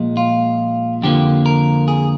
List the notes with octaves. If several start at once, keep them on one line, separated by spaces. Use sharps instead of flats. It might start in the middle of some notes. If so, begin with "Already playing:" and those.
Already playing: A#2 F3 G#3
F4
F2 D3 F3 A#3 G4
A#4
G#4